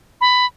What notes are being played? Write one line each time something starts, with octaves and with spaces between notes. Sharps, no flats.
B5